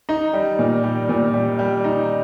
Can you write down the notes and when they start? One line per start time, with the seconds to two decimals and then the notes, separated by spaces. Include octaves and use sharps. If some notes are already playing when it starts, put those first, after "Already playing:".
0.09 D#4
0.33 G3
0.59 A#2
0.84 G3
1.09 A#2
1.34 G3
1.59 G3
1.84 D#4